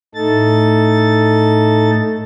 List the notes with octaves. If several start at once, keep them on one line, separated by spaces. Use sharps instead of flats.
A2 A3 D#4 A4 A6